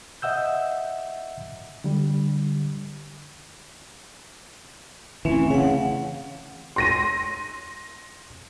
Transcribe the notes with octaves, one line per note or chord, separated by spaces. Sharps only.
D#5 E5 F#5 E6 G6
D3 G3
E3 A3 C4 C#4
C#3 F5 F#5
C6 A#6 D#7